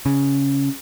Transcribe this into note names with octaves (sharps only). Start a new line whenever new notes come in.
C#3